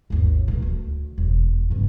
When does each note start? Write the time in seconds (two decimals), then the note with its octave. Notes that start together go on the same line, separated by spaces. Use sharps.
0.10 G#1 D#2
0.48 D1 E3
0.62 D2
1.18 E1
1.70 G2 C#3